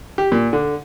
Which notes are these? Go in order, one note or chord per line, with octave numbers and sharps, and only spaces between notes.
G4
A#2
D3